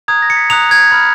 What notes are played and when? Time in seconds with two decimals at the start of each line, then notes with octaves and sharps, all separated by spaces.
0.08 A#5 D#6 F#6 G#6
0.22 A#6
0.30 C#7
0.36 B6
0.50 A#5 D#6 F#6 F7
0.71 G#6
0.92 B5 F6 G#6